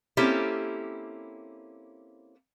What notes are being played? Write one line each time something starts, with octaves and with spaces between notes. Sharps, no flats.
A#3 C4 C#4 E4 G4 A4